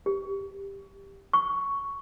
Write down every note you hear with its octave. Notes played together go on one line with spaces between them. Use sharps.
G4
C#6